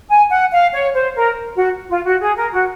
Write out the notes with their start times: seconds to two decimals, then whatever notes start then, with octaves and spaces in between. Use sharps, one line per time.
0.09 G#5
0.30 F#5
0.52 F5
0.73 C#5
0.93 C5
1.15 A#4
1.57 F#4
1.89 F4
2.04 F#4
2.21 G#4
2.36 A#4
2.52 F#4